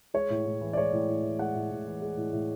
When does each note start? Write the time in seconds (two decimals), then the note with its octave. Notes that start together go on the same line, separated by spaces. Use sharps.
0.14 G#3 C#5
0.30 A2
0.46 A2
0.61 E3
0.73 D5
0.77 G#3 C#5
0.93 A2
1.09 A2
1.23 E3
1.39 G#3 F#5
1.55 A2
1.71 A2
1.87 E3
2.02 G#3
2.17 A2
2.33 A2